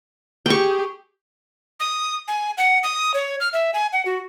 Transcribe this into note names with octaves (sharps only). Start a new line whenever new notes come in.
G4 G#4 G5 C#6
D#6
G#5
F#5
D#6
C#5
F6
E5
G#5
F#5
F#4